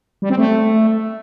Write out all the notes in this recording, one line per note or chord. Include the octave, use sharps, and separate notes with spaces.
G3
C4
A3